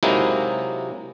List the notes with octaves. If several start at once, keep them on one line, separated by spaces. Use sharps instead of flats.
C3 F#3 G#3 A#3 D#4 E4